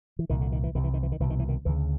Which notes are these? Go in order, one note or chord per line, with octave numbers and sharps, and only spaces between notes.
E3
C2 A#2 D#3
D3
D#3
E3
C2 C3 D#3
E3
D#3
E3
D#3
C2 B2 E3
D#3
E3
D#3
D2 C#3 E3